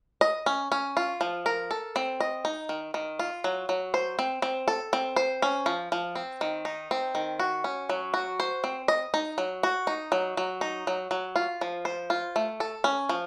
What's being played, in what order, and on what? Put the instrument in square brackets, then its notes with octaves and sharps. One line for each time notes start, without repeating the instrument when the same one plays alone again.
[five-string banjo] D#5
C#4
C#4
F4
F3
A#4
A4
C4
D#5
D#4
D#3
D#3
F4
F#3
F#3
C5
C4
C4
A4
C4
C5
C#4
F3
F3
C4
D#3
D#4
C4
D#3
F#4
C#4
F#3
F#4
C5
C4
D#5
D#4
F#3
F#4
D#4
F#3
F#3
D#4
F#3
F#3
F4
F3
C5
F4
A3
A4
C#4
F3